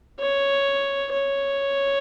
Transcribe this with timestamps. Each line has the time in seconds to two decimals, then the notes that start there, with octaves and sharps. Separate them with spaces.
0.20 C#5
1.12 C#5